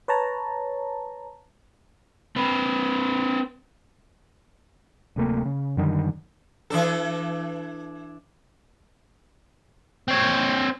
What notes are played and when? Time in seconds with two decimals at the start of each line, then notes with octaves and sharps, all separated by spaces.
0.08 B4 C#5 A5 A#5
2.36 C4 B4
5.16 D1 C3 A3 A#3
5.45 C#3
5.77 F#2 D3 D#3 G3
6.70 E3 D4 A4
10.08 C4 C#5